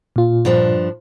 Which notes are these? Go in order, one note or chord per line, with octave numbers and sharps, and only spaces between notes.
A#2 F4
G2 F3 D4